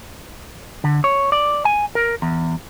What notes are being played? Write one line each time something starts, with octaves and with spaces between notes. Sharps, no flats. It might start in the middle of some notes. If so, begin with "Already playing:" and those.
D3
C#5
D5
G#5
A#4
E2